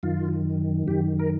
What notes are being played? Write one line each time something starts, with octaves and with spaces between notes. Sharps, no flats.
F#2 D#3 F4
F#2 D#3 G4
A#4